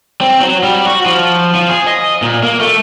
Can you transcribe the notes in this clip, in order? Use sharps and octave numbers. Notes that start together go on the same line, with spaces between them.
C4
F#3
G3
F#4
F3
F3
G#4
D#5
A#2
A#3
A3